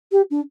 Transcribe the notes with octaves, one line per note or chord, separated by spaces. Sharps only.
G4
D4